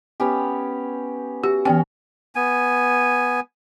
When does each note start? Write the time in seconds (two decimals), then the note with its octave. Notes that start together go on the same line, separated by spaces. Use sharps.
0.20 B3 C#4 G4
1.44 F#4 G4
1.65 E3 B3 C#4 G5
2.35 B3 G#5